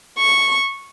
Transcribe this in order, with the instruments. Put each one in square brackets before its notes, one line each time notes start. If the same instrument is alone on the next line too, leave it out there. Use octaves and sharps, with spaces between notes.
[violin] C#6